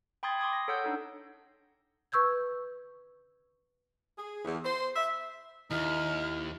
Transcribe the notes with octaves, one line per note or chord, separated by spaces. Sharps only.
G5 B5 C6 D#6 G#6 A6
C6 D6 D#6 G#6
A#6
A4 C#5 F#5 E6 G6
D4 D#4 A4
B4 C#6 E6 G6 G#6
G#4
E2
C5
E5
D#2 D#4 E4 F6